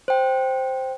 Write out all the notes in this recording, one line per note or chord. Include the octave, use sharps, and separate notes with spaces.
C5 G5